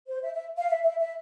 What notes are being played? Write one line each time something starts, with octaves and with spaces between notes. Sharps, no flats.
C5
E5
E5
F5
E5
E5
E5